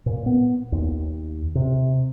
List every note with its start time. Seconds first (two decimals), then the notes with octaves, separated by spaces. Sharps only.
0.06 A#2
0.26 B3
0.72 D#2
1.55 C3